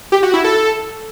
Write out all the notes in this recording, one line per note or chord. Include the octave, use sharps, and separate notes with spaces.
G4
F#4
E4
A4